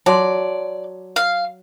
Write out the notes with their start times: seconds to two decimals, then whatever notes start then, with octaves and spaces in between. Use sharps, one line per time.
0.06 F#3 D5 A5 C6
1.16 F5